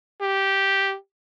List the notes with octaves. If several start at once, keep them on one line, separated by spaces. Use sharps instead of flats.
G4